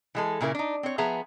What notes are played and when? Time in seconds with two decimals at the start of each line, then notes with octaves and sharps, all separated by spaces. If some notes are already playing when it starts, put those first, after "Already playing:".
0.15 E3 G#3 A4
0.41 A#2 C#3 E4 A#4
0.55 D4 D#4
0.83 C4 C#5
0.98 F3 B3 G#4 E5 A#5